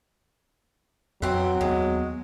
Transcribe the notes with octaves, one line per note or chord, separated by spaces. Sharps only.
F2 E3 F#3 C4
D#2 G#3 B3